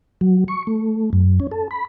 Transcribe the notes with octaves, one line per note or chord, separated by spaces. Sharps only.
F#3
C#6
A3
F#2
C#4
A4
B5